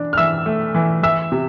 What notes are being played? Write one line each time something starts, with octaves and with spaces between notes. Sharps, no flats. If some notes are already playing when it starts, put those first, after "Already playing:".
Already playing: E3 D4
F6
E3 E5 E6
A3
E3
E3 E5 E6
C3